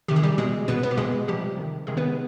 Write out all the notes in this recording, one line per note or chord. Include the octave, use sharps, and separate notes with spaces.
C3 D#3 G4
G#4
G3 G4
B2 G#3 G#4
B2 B3 B4
B3 B4
G4
B2 G#3 G#4
C3 F3 G3 G4
C3 D#3
C3 D#3 G#3 G#4
B3 B4